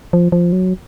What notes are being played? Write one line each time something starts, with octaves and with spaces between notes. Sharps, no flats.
F3
F3
F#3